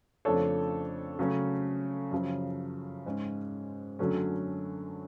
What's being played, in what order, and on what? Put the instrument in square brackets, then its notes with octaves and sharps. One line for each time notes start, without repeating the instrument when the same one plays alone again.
[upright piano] F2 C#3 F3 A3 D4 A4 C#5
C#3 F#3 A3 C#4
F#2 C#3 F3
G#2 G#3 C#4
F#2 D3 F#3 A3 C#4